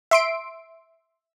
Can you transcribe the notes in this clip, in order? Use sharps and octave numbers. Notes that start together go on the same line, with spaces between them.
E5 C6 D7